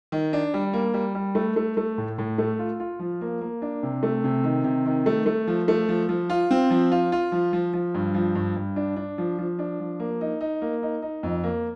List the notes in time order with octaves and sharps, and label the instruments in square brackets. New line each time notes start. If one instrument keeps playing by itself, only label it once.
[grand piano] D#3
D4
G3
A#3
G3
G3
A3
A3
A3
A2
A2
A3
F4
F4
F3
A#3
A#3
D4
C3
A3
C3
D#3
C3
D#3
A3
A3
F3
A3
F3
F3
F4
C4
F3
F4
F4
F3
F3
F3
G2
F3
G2
G2
D4
D4
F3
F3
D4
F3
A#3
D#4
D#4
A#3
D#4
D#4
F2
A#3